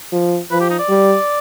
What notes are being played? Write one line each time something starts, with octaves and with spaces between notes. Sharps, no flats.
F3
F3 B4
G4
D#4
D5
G3